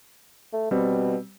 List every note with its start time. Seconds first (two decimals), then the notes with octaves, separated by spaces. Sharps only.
0.53 A3
0.71 B2 G3 C4